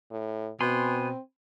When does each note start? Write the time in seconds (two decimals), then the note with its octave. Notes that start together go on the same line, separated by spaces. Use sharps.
0.10 A2
0.60 B2 C4 G#5 B5 C6